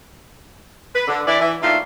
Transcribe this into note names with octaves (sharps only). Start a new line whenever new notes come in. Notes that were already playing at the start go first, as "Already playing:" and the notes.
B4
D3
E3 D4 E4 D5
E3
D#3 A3 A#3 D4 E4 F4